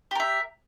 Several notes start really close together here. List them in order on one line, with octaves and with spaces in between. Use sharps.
G4 A#4 E5